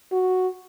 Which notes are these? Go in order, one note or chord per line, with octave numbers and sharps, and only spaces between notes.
F#4